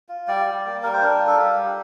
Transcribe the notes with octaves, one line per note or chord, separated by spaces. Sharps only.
F4
G3 D5
G3
A#3
G3 A#4
C5
D4 A#4
F4
A4
G3 G4
G3